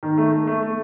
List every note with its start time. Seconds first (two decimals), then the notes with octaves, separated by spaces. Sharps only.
0.03 D#3
0.18 A3
0.32 A3
0.47 A3
0.62 A3